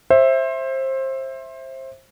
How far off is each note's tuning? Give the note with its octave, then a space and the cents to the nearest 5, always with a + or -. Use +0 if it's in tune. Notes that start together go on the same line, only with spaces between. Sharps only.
C5 +25 E5 +0